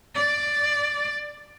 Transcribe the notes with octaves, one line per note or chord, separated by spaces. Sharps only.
D5